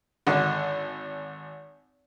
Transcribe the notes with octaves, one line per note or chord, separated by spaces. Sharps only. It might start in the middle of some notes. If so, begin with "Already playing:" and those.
G#1 D3